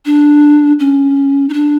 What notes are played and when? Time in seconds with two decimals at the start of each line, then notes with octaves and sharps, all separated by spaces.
0.05 D4
0.79 C#4
1.49 D#4
1.53 D4